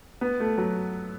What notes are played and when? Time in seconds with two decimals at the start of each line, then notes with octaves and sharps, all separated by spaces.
0.21 B3
0.40 A3
0.58 F#3